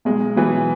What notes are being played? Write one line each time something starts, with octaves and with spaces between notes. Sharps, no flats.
B1 G#3
B2 E3 F#3 B3